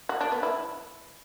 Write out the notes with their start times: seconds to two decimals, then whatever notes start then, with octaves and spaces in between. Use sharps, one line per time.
0.09 F#4
0.21 D4
0.32 B3
0.43 E4